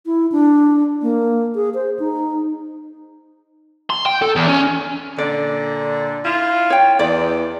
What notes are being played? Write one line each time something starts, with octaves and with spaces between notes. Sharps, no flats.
E4
D4
A#3
G#4
C5
D#4
C6
G5
A4
E2
C#4
A#2 D3 D5
E4 F4
C#5 G5
E2 D5